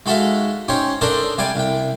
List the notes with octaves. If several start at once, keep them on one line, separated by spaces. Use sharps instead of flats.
G#3 D#4 F#4 A4 E5 F5
C#4 D#4 G4 C5 C#5
D4 A4 A#4 C5 D5 D#5
C3 G3 D5 G5 G#5
C2 G5